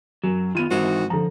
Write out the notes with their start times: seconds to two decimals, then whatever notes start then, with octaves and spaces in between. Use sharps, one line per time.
0.24 F#2 F#3
0.55 D#3 B3 F4 D#7
0.71 G#1 E3 D#4 F#4 C5
1.10 D3 F3 A#5